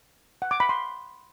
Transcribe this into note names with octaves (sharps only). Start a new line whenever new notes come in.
F#5
D6
B5
C6